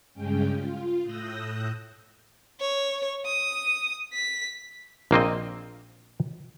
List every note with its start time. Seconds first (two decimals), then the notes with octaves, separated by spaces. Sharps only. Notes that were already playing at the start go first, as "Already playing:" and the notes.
0.14 G2 C#3 G#3 C#4 G5
0.51 F4
1.03 A2 D#6 E6 F#6 G6 A#6
2.60 C#5
3.26 D#6
4.14 B6
5.11 A#1 A#3 C4 D#5